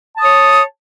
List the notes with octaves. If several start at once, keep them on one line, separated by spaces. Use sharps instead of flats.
C#5 A5 D#6